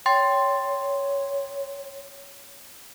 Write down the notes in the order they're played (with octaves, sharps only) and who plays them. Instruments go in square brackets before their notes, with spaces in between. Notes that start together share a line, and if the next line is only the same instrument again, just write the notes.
[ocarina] C#5 [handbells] G5 C6 A6